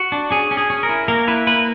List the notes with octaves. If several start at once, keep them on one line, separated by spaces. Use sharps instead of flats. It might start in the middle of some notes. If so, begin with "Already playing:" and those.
Already playing: F#4
D4
C#4 G#4
C#4
G#4
C#4
A#4
E4
A#3 A#4
E4 B4
A#3 B4